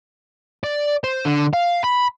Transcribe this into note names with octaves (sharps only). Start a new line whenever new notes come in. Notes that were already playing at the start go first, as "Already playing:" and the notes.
D5
C5
D3
F5
B5